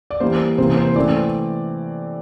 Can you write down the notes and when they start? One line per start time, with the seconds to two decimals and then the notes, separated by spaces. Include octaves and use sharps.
0.10 D5
0.20 E3 G3 A#3 C5
0.58 C3 E3 A#3 C5
0.77 C5
0.96 E3 A3 C4 D5